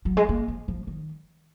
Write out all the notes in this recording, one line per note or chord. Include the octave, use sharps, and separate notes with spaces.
F#3
G#3
A#3
F3
F3
D#3